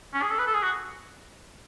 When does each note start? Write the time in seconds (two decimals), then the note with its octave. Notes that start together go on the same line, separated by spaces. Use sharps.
0.14 C#4
0.22 G#4
0.31 A4
0.39 B4
0.47 A4
0.55 G#4
0.63 F#4